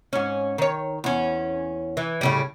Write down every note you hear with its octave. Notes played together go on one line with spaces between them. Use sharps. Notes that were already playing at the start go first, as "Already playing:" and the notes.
G#2 C#4
D#3 C#5
E2 C#4
E3
A2 C#3 G3